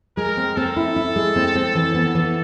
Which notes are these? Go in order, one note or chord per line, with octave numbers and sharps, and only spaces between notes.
G#3 A#4
C4
C4 A4
E4
E4
G#3
C4
C4
E3
B3
E3